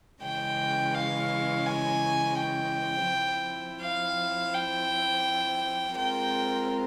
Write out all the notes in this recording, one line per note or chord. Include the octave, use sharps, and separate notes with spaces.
C#3 E3 G#3 C#4 G5
F5
G#5
G5
F3 C4 E4
F5
G5
G#3 C4 F4 A#4 G5